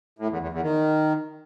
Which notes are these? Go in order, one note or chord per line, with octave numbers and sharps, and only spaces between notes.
A2
E2
E2
E2
D#3